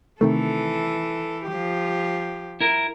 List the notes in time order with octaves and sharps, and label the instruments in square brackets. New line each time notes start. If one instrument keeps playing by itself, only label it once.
[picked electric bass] C3 D#3 A3 [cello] E3 A4
[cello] F3 G4
[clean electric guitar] E4 A#4